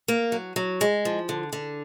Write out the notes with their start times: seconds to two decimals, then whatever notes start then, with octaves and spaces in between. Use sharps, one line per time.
0.08 A#3
0.32 F#3
0.56 F#3
0.81 G#3
1.05 F3
1.29 D3
1.53 D3